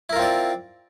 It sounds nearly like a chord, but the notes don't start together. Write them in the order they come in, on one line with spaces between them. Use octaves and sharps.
E4 A#4 F4 C4 D5